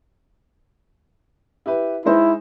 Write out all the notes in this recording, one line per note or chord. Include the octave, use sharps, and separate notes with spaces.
E4 G4 B4
G#3 D#4 E4 C5